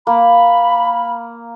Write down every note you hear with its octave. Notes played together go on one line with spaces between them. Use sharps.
A#3 B5